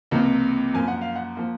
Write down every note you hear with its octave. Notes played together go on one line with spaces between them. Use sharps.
C#2 C3 F3 A#3
F#2 F3 A#3 G#5
F#5
F5
F#5
F3 A#3